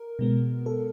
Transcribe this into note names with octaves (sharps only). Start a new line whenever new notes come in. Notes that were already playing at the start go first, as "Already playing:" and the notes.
Already playing: A#4
B2 G#3 B3
A4